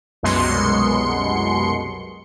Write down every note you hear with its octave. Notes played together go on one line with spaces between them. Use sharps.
C2 F#2 B2 G#3 C6 C#7